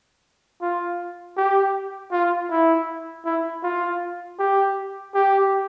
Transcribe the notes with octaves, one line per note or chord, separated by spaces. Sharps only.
F4
G4
F4
E4
E4
F4
G4
G4